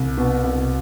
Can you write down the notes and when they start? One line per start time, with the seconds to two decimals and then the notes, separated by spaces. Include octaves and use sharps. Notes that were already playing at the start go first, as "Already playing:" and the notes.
Already playing: C2
0.17 B2
0.44 C2